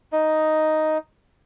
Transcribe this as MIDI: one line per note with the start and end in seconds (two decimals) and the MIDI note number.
0.13 0.98 63
0.13 0.98 75